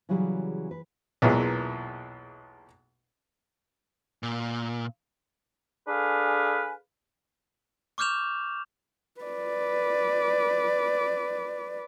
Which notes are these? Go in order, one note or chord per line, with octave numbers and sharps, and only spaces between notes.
C#3 E3 F#3 G3 G#4
B4
B1 E2 A#2 E3 G#3
A#2
D4 G#4 A4 B4 F5 G#5
C#6 D6 F6 G6 E7 F7
B4 D5